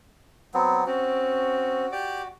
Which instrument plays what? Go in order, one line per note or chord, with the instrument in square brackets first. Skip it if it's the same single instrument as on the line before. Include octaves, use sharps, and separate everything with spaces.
[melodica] F#3 B3 C4
[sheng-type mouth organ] C4 C#4 [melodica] F#4
[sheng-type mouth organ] G4 D5 D6